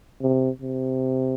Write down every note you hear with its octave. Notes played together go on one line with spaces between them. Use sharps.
C3
C3